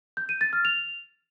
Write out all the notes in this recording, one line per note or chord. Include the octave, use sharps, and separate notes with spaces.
G6
D#7
A6
F6
F7